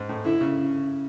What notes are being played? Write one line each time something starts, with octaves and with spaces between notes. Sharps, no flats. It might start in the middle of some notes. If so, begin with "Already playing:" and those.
Already playing: G#2
A2
D3 E4
C#3